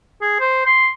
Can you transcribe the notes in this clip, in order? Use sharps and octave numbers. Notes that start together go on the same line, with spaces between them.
G#4
C5
C6